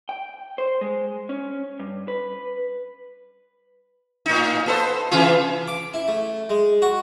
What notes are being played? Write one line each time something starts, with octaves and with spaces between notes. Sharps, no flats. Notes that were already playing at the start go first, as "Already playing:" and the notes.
G5
C5
G#3
C#4
G2
B4
A2 D#4
B3 A4 C5
C3 E3 F4
D6
E4
A3
G#3
F#4